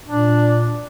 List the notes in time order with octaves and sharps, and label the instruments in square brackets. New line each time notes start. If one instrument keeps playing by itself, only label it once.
[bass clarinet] A#2 [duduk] D4